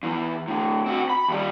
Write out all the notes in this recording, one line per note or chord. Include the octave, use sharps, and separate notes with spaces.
E2 E3
A2 D3
C4 F#4
B5
D#2 G3